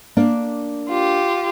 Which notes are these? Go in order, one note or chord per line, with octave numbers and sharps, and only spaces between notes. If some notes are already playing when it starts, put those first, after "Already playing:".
A#3 D4
F4 G4